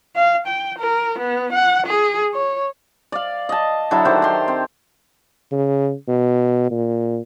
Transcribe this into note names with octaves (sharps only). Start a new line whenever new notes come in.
F5
G5
A#4
B3
F#5
G#4
C#5
D5 F5
D#5 A5
D3 F#3 E4 A4
D#3 F#3 G4 C5
G4 C6
C4
C#3
B2
A#2